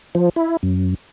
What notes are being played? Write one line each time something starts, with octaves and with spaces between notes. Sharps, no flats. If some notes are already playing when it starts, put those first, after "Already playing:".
F3
E4
F#2